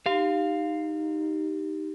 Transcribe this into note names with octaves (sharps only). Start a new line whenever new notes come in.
D#4 G4 F5